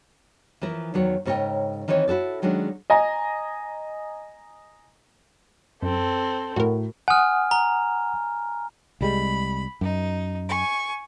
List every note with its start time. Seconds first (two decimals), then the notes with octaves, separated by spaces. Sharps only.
0.61 E3 F3 E4 A#4
0.94 E2 D#3 F#3 C#5
1.25 G#2 C#3 A#4 C#5 D#5 G5
1.88 D#3 E3 C4 D#4 C#5
2.08 E4 F#4 A4 D5
2.42 D#3 F#3 G#3 C#4 D4
2.90 D#5 G#5 A#5
5.82 F#2 C4 A4
6.56 A2 F#4 A#4
7.08 F#5 G#5 D#6 F6
7.51 A#5
9.01 C2 G3 G#3 B5
9.81 F#2 D#4
10.49 G#5 C#6